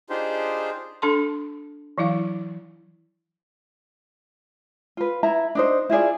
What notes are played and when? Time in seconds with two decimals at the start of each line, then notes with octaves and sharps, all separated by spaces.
0.10 D4 D#4 F4 G4 G#4 C5
1.02 D4 A4 A5 C6
1.98 E3 F#3 E4 F5
4.97 F4 B4
5.23 E4 E5 A#5
5.55 D4 D#4 C5
5.90 E4 F4 G#4 D5